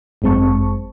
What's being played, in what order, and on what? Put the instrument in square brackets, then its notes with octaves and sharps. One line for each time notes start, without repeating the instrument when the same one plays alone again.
[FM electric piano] G1 F#2 G#3 C4 A5 C#6